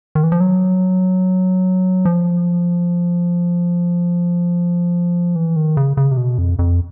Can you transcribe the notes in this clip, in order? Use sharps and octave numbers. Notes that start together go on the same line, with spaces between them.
D#3
E3
F3
F#3
F3
E3
D#3
C#3
C#3
C3
B2
F2
F2